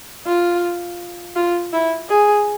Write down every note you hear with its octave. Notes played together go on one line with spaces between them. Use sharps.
F4
F4
E4
G#4